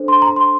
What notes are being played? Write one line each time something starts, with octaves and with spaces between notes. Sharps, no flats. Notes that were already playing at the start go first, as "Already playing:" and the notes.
Already playing: D4 A4 C5
C6
A#5
C6